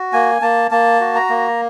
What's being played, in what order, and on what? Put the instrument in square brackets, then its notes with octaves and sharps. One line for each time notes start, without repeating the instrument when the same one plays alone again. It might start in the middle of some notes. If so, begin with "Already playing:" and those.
Already playing: [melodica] F#4
A#3 G#5
A#3 A5
A#3 A5
F#4
A#5
A#3